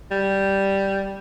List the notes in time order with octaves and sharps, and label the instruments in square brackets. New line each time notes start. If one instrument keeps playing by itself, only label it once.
[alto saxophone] G3